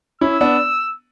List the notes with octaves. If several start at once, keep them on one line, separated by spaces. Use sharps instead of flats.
C#4 E4 E6
B3 D4